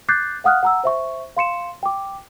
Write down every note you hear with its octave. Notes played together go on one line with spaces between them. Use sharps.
D6 F#6 G6 A6 C7
F5 F#5 D#6 F6 F#6
F#5 A#5 E6
C5 E5 C#6
F5 C6 C#7 E7
G5 D6